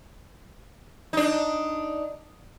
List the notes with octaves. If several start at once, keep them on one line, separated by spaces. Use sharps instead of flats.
D4 D#4